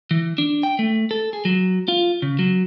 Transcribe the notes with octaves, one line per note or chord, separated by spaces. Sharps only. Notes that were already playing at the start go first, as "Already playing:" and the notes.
E3
D4
G5
A3
A4
G#4
F#3
F4
C#3
F#3